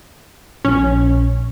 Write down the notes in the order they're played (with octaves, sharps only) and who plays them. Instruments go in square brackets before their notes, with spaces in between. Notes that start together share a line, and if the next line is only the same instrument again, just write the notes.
[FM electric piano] A#1 [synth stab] C#4